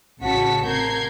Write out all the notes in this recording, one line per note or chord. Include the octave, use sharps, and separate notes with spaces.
A1 C#3 F#4 A5 B6 C#7
C3 A#4 G6 G#6 C7